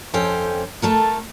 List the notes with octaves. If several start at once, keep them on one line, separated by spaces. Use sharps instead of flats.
F2 C#4 A4 C5 G5
A3 A4 A#4